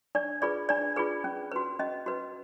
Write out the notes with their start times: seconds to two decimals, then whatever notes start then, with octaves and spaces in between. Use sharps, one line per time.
0.15 D4 D5
0.42 F4 G#4 B4 D5
0.69 D4 D5
0.96 F4 G#4 B4
1.24 C#4
1.51 F#4 B4
1.79 C#4 D#5
2.06 F#4 B4